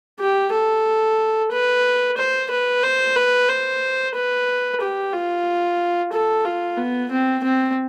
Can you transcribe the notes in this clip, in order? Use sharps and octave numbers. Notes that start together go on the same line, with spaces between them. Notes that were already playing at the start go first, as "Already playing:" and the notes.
G4
A4
B4
C5
B4
C5
B4
C5
B4
G4
F4
A4
F4
B3
C4
C4